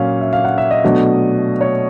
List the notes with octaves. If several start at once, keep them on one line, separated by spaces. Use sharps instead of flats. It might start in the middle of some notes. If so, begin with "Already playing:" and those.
Already playing: A#2 F#3 A#3 C#4 F5
E5
F5
F#5
E5
D#5
B2 F#3 A3 D4
C#5